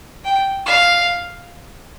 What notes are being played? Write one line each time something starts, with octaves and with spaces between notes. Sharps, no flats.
G5
F5